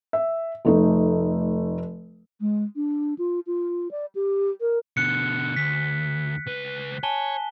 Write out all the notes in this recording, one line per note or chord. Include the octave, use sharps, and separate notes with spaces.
E5
F1 A3 D#4
G#3
D4
F4
F4
D5
G4
A#4
B2 D3 F#6 C#7
D2 B6
C#2 B4
C#5 G#5 A5 G7